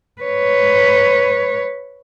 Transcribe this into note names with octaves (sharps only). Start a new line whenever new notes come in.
B4 C#5